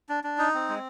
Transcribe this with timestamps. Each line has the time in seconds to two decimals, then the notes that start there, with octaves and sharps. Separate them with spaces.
0.09 D4
0.24 D4
0.38 D#4
0.54 C4
0.69 G#3